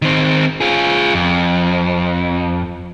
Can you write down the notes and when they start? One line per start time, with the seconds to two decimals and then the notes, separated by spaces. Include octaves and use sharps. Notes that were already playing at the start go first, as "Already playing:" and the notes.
0.02 D#3 C4
0.61 F4 G#4
1.14 F2